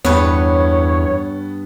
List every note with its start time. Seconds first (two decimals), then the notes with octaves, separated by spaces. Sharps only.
0.05 E2 G2 B3 B4 C#5